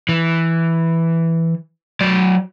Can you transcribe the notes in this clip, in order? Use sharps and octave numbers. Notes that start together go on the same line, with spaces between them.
E3
F#3 D5